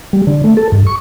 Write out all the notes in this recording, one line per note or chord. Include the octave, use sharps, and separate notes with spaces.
G3
D3
A3
A4
G2
C#6